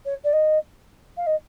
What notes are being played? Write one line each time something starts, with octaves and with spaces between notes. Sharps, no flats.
C#5
D5
D#5
F5
D#5